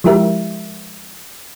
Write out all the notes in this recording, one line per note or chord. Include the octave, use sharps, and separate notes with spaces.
F3 G#3 E4 G4 A#4 E5